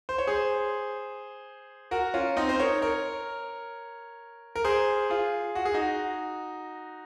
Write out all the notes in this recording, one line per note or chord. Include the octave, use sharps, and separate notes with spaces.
C5
C#5
G#4 C5
F#4 A#4
C#4 F4
C4 D#4
C5
A#4 C#5
A#4 C#5
A#4
G#4 C5
F4 G#4
F#4
G#4
D#4 F#4